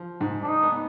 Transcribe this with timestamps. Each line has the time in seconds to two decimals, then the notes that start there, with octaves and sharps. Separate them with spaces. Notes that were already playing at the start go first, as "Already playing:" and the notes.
Already playing: F3
0.21 G#2
0.43 D4
0.48 D#4
0.63 B3